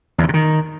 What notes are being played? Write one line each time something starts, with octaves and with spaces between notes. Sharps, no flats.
E2
D#3
C3
D#3